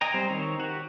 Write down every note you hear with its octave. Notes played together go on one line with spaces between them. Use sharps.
D#5 G5 G#5 A#5
G3 C4 C5
D#3 C4 D#4 C#5
F#4 G4